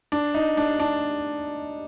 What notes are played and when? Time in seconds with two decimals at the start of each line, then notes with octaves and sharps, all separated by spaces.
0.12 D4
0.34 D#4
0.57 D4
0.80 D4